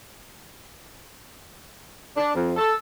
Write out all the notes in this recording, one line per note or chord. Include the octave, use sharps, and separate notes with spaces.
D4
F2
A4